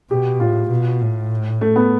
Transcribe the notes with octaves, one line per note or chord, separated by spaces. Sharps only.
B2 G4
A2 F4
B2
A2
A3
B3